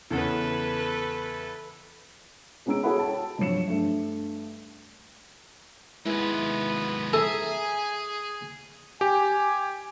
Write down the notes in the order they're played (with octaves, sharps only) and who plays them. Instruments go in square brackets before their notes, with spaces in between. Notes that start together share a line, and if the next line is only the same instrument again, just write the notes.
[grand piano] E2 C#3 B3 [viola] A4 B4
[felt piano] G#3 B3 C#4 A#5 E6 D7
F#4 G#4 A4 C#5 F#5 B5
C#5 G5 A5
G2 F3 F#3 C#5 C#7 E7
G2 A3 D4
[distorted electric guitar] D#2 G#3 [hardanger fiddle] B3 [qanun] E4 D#5
[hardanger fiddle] G#4 [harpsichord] A4 [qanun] E5 A#5 [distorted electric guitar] G#5
[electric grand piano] G4 [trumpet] G#5